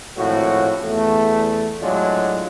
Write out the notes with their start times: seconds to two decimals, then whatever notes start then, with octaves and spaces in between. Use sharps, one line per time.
0.16 G#1 A2 F3 F#4
0.83 E2 A3
1.81 A2 F#3 G#3 D4 F4